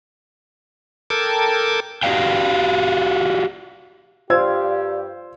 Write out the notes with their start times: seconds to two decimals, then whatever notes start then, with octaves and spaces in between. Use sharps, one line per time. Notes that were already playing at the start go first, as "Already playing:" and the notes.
1.10 A4 A#4 G5 A5 D6 G#6
2.03 F#4 G4 C5 D5 F5 G5
4.30 G2 F4 G4 C5 D5 F5 E6 G#6